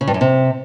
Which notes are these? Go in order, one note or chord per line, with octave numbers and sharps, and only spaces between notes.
C#3
G2
F#2
C3